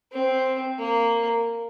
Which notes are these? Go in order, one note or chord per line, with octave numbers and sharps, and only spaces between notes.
C4
A#3